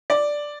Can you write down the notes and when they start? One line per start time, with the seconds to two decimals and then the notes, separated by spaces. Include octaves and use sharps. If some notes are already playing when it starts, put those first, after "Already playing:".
0.10 D5